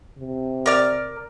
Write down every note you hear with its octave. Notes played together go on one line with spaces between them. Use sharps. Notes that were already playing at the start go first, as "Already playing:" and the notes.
C3
A#4 D5 F6